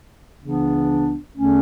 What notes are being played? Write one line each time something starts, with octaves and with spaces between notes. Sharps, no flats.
C#2 C#3 E3 B3 D4
E2 D3 A3 C#4